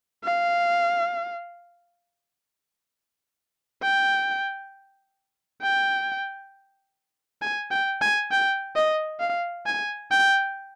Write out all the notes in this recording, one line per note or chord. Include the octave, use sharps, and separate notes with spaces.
F5
G5
G5
G#5
G5
G#5
G5
D#5
F5
G#5
G5